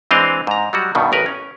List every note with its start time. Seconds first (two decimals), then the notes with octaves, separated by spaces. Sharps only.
0.11 E3 G#3 C4 D4 D#5 F5
0.47 G#2 A#5
0.73 F#3 G3 F#4
0.95 G2 B2 D#3
1.12 A1 A#4 B4
1.26 C#4